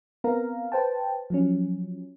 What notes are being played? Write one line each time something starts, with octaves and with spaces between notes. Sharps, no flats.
B3 C4 A#4 F5 A#5
B4 C5 G5 A5
F3 F#3 C#4